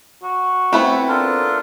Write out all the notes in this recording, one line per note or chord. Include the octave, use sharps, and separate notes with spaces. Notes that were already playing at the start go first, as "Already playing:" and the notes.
F#4
A3 B3 C4 E4
D4 F4 A4 A#4